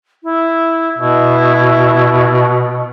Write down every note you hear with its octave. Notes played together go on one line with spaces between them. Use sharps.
E4
B2 E4